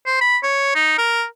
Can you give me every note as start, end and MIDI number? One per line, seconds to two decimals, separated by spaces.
0.06 0.16 72
0.21 0.37 83
0.43 0.71 73
0.75 0.95 63
0.98 1.24 70